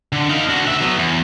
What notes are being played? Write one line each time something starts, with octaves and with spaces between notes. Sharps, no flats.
D3
D#4 F5
D4 F#4
D2 E5
F#3 B3
E2